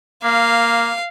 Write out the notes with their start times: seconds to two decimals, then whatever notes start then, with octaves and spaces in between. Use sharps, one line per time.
0.24 A#3 F5